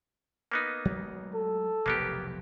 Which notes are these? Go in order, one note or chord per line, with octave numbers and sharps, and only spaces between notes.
A#3 B3 D#4
F#3 G#3 A3
A4
F1 B1 G#2 A#3 B3 G4